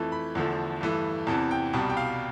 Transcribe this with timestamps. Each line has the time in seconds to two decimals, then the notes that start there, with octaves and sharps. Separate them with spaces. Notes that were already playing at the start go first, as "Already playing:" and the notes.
Already playing: F2 E3 A3 A5
0.12 B5
0.35 E2 D3 F3 A3
0.81 G2 E3 A3
1.27 E2 C3 E3 A5
1.51 G5
1.73 C2 B2 G3 A5
1.90 G5
1.97 F5